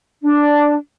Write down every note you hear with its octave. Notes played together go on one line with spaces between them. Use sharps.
D4